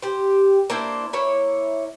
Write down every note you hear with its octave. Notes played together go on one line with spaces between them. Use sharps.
G4 C5
A#3 D4 E4 C5
A#3 E4 C#5